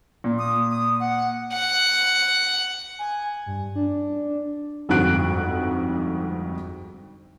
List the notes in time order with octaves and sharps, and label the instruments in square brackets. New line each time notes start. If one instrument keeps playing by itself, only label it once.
[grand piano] A#2
[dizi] D#6
D#6
F#5
[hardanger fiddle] F#5
[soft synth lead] G#5
G2
D4
[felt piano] G1 F2 G#2 F#4 F#6 D7